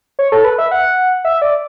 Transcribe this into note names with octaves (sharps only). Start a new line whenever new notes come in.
C#5
A4
B4
E5
F#5
E5
D5